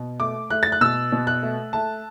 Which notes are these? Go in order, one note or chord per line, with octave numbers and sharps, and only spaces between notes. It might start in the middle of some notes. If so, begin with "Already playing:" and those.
Already playing: B2
A3 D6
A3 F#6
A6
F#6
B2 E6
B2
F#6
A3
A3 A5